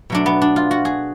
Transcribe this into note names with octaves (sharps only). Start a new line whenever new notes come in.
B2 F#3 A3 D4
B3
D4
F4
F#4
G#4